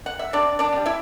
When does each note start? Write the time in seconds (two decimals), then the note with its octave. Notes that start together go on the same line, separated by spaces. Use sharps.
0.06 F#5
0.19 E5
0.33 C3 D4 D5
0.59 D4 D5
0.72 B3
0.76 G3
0.86 E4 E5